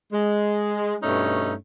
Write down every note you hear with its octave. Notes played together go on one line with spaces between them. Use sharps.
G#3
G2 B2 A3 C#4 D#4